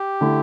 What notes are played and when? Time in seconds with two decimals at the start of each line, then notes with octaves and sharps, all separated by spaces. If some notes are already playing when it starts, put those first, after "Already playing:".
Already playing: G4
0.21 D3 A3 E4